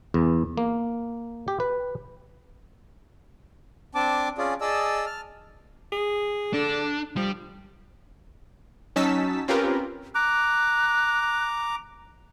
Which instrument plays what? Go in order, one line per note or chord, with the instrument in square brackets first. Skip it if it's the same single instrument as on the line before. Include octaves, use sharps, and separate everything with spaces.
[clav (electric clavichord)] E2
A#3
G4
B4
[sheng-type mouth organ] C4 D4 A5 D6
C#4 F4 G#4 D5
G#4 D5 D#5 A5 E6
A5 F6
[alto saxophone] G#4
[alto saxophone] D3 [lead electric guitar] D4
[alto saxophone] F3 [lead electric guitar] G3
[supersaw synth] F#3 C#4 D#4 A5 E6 B6
C4 C#4 F4 G4 A#4 B4
[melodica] A#5 D6 [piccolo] F#6